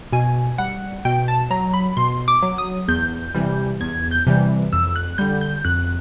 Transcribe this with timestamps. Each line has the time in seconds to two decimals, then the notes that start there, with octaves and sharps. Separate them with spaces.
0.12 B2 G#5
0.58 G3 F#5
1.05 B2 G5
1.28 A5
1.50 F#3 A#5
1.74 B5
1.97 B2 C6
2.28 D6
2.42 F#3
2.58 D#6
2.88 E2 G6
3.34 C3 E3 G3
3.80 E2 G#6
4.11 G6
4.27 C3 E3 G3
4.73 F2 E6
4.96 F#6
5.18 D3 G3 G6
5.41 G6
5.65 F2 F#6